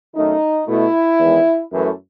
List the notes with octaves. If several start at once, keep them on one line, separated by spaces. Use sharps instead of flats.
F#2 D#3 A3 D#4
B2 A3 E4
E2 D#3 G#3
F#2 E3 A3